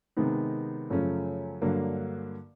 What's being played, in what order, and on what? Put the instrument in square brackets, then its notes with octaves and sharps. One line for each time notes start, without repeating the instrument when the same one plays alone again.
[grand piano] C3 D#3 G#3 B3 D#4
F#2 C#3 F3 A3 C#4
G2 D3 F#3 A#3